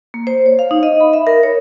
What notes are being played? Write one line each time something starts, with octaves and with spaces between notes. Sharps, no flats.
A#3
C5
C#5
F5
D#4
D#5
B5
E5
A#4
C#5